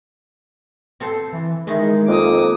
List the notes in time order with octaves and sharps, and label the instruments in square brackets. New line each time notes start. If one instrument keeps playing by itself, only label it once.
[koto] C4 A4 C5
[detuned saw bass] E3
[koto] D#3 D#4 E4 [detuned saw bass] G#3
[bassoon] F2 [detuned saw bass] A#3 [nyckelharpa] D6 D#6